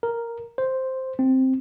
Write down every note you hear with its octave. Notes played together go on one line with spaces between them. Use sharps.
A#4
C5
C4